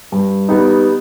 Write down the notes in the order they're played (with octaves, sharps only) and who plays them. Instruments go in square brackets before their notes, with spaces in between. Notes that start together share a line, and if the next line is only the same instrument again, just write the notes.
[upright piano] G2
G3 B3 D#4